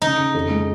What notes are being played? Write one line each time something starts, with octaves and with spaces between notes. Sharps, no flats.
C#3 D#4
C#3
F2
G#3